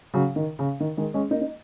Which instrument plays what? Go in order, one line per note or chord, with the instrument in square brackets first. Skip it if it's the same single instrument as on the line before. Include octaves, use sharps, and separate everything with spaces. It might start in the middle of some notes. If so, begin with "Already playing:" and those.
[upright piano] C#3 F#3
D#3
C#3
D#3
D#3 G#3
G#3 C#4
A#3 D#4
D#4